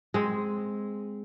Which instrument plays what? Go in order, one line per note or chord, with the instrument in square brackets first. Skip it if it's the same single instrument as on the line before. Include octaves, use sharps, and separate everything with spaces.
[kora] G#3 C4